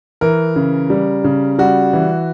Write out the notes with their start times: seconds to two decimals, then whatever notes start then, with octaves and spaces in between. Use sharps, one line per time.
0.21 E3 A#4
0.56 C#3
0.90 G3
1.24 C#3
1.59 G3 F#4
1.93 E3